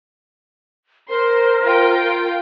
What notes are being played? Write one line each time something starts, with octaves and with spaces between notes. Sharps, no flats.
A#4 C5 C6
F4 G5